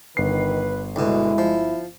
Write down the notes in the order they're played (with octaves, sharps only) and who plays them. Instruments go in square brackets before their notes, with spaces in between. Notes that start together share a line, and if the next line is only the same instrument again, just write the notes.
[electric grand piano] G1 C7 [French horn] D#3 [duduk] B4
[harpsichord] D2 B2 [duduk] G#3 [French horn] E4
[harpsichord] F3